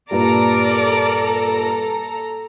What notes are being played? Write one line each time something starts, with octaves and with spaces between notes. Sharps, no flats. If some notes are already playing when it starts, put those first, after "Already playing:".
G2 A#2 G3 A4 A#4 D5 A#5